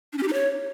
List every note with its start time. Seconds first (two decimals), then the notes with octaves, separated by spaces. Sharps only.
0.13 D4
0.18 C#4
0.23 G4
0.28 D#4
0.33 C#5